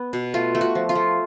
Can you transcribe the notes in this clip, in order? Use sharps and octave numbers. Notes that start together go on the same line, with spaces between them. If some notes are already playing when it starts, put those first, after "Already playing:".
Already playing: B3
B2
A3 F4
A3
F#4
F3
F4
A3